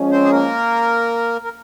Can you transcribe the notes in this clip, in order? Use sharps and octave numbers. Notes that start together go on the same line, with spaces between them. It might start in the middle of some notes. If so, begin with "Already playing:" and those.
Already playing: F3 G#3 C#4
C4 C5
G#4
A#3 A#4
A#4